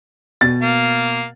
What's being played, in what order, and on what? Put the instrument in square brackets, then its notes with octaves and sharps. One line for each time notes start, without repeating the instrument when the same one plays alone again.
[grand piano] B2 A6
[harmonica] A#3 F5